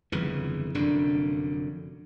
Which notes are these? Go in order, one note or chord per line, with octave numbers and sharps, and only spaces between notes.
G1 F2 C#3 E3
F1 F#2 D3 D4